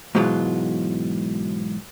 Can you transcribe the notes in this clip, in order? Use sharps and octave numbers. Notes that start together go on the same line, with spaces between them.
G#2 B2 E3 F#3 G#3 F4